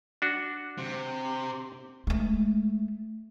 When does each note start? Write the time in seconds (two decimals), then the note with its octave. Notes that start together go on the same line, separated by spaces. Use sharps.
0.22 D4 F#4
0.78 C3
2.07 G#3 A3